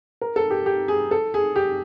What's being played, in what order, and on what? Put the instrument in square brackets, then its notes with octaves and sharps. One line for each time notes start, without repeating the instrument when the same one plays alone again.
[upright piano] A#4
A4
G4
G4
G#4
A4
G#4
G4